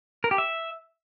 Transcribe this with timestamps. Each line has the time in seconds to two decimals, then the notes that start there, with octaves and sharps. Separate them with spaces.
0.24 A#4
0.31 G4
0.38 E5